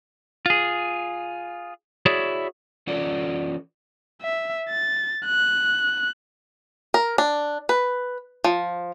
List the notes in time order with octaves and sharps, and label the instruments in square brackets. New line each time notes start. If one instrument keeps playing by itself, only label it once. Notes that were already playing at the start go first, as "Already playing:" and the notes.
[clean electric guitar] F4 G#4
E4 F#4 G#4 C#5 D5
[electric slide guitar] E3 C#4 F4 F#4 A4 D5
[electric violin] E5
A6
F#6
[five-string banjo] A#4
D4
B4
F3